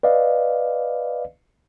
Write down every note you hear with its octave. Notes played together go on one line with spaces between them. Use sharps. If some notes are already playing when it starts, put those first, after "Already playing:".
B4 D5 D#5 F5